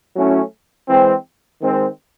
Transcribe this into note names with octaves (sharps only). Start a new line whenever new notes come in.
F#3 A3 C#4 E4
E3 G#3 C4
D#3 G#3 C4